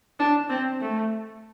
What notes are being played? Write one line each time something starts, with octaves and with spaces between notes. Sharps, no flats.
D4
C4
A3